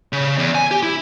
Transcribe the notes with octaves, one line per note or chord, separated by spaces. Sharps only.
C#3
E2
G#5
G4
E4